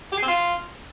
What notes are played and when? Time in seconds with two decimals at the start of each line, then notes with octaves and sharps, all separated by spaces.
0.12 G4
0.17 G#4
0.22 C4
0.28 F4